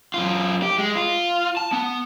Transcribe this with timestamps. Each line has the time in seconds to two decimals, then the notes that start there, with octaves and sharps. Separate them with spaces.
0.14 F#2 F4
0.62 G4
0.78 G#3
0.96 F4
1.57 A5
1.73 B3